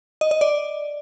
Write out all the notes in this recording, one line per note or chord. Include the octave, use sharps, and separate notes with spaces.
D#5
D#5
D5